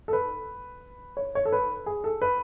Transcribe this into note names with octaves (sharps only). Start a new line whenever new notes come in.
A4
B4
C#5
C#5
A4
B4
G#4
A4
B4